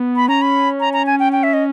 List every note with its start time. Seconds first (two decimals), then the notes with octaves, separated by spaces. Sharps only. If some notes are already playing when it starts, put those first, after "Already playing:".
Already playing: B3
0.16 B5
0.28 C#4 A#5
0.42 B5
0.80 A#5
0.93 A#5
1.06 G#5
1.19 G5
1.32 G5
1.43 E5
1.53 D#5